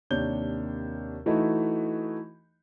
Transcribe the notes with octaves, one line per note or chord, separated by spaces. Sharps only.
D#2 C3 D4 C#5 G6 G7
E3 A3 D#4 E4 F#4 D#5